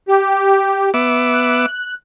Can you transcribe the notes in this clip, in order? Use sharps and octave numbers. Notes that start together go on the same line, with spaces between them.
G4
B3 E5 D6
F#6